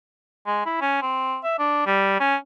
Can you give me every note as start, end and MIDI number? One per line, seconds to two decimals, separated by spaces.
0.47 0.62 56
0.66 0.76 64
0.81 1.00 61
1.02 1.38 60
1.43 1.57 76
1.59 1.85 62
1.86 2.15 55
2.20 2.36 61